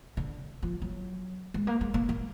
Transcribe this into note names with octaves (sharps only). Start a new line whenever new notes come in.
D3
F3
F#3
G#3
A#3
G#3
A#3
A#3